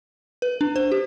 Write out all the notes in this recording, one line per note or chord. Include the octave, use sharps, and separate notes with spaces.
B4
D4
C5
G4